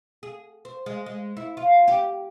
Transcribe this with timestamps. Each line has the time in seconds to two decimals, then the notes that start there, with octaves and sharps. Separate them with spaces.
0.23 G#4
0.65 C5
0.86 G#3
1.06 G#3
1.37 E4
1.57 F4
1.88 G4